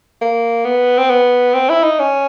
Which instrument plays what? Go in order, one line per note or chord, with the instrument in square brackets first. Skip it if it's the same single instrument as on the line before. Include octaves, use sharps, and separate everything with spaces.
[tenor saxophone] A#3
B3
C4
B3
C4
E4
D#4
C#4